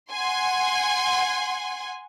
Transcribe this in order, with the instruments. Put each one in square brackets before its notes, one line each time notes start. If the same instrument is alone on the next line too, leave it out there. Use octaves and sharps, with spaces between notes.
[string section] F#5 G#5 C6